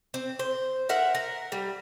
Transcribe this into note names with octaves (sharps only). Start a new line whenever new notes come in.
C4
C5
A#4 E5 F#5
A#4
G3